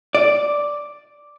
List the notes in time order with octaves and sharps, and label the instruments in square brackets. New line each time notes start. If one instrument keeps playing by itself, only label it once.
[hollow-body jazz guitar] D5